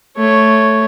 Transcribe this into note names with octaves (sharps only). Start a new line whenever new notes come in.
A3 C#5